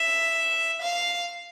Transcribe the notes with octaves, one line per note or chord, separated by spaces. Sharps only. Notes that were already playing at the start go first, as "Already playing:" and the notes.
Already playing: E5
F5